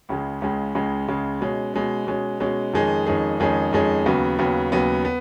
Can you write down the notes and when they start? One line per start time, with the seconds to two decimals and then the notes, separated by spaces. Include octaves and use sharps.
0.09 C#2 C#3 G#3
0.41 C#2 C#3 G#3
0.75 C#2 C#3 G#3
1.08 C#2 C#3 G#3
1.41 B2 G#3 C#4
1.74 B2 G#3 C#4
2.07 B2 G#3 C#4
2.40 B2 G#3 C#4
2.73 F2 D#3 G#3 C#4 G#4
3.07 F2 D#3 G#3 C#4 G#4
3.40 F2 D#3 G#3 C#4 G#4
3.73 F2 D#3 G#3 C#4 G#4
4.06 D#2 C#3 F#3 B3
4.39 D#2 C#3 F#3 B3
4.72 D#2 C#3 F#3 B3
5.05 B3